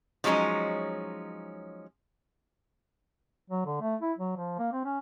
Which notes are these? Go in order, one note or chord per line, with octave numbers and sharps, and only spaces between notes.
F3 F#3 G#3 C#4 D#4
F#3
D3
A3
E4
F#3
F3
A#3
C4
C#4